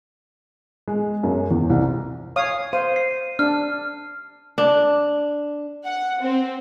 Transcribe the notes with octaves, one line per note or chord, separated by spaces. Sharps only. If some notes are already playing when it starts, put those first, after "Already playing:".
G#3
F#2
E2
C2
C#5 F5 D#6
C5 F5 D#7
C7
D4 F6
D4
F#5
C4